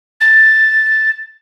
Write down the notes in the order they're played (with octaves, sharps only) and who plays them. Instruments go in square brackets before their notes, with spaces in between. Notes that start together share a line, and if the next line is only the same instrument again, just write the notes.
[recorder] A6